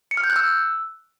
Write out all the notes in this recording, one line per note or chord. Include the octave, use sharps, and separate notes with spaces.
C#7
F6
G6
F#6
E6